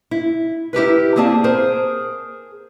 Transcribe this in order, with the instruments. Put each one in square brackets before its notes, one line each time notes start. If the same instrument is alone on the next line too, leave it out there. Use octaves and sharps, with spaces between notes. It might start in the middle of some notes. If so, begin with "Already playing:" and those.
[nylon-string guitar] E4
E4 G4 A#4 B4
A#3 C4 G#4 D5 A5
G#4 A#4 C5